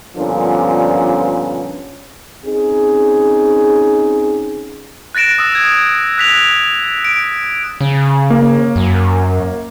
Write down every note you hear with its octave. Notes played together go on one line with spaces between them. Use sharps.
G2 A#2 D3 F3 B3 C#4
C4 C#4 D#4 G#4
F#6 A6 A#6 D7 E7
D#6 E6
D#6 G#6
F#6 B6 F7
D7
C#3
A#3
F#2